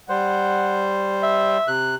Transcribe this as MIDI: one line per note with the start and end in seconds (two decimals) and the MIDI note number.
0.09 1.58 55
0.09 1.58 72
0.09 0.89 78
1.23 1.70 76
1.68 1.95 48
1.68 1.95 90